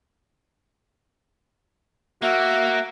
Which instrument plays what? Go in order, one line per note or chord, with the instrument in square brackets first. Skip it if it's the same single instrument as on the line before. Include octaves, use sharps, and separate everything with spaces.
[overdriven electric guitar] A#3 [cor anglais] F#4 [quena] E5